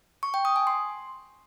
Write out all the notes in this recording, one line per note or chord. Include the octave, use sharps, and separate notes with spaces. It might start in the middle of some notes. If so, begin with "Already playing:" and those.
C#6
G5
D#6
G#5
C6